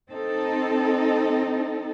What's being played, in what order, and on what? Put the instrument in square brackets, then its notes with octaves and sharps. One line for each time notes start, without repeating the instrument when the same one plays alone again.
[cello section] C4 D#4 A4